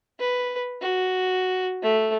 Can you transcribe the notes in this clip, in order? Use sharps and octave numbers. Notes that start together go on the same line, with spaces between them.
B4
F#4
A3